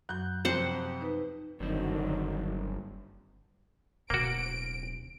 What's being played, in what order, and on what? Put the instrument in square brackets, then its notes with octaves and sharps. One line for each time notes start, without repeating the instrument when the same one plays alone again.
[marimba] F#2 F#3 [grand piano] F#6 G6
[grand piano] F2 C3 [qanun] C5 F#5
[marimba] D#4 B4
[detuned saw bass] F#1 [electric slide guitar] G2 C4 [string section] D3 F#3 [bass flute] D#3
[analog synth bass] D1 [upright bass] B2 D3 [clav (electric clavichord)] A#3 F#4 [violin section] D7